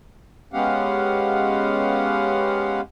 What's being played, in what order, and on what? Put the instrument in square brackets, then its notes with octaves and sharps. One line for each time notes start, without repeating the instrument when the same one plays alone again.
[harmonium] G#3 B3 C#4 G4 F5 F#5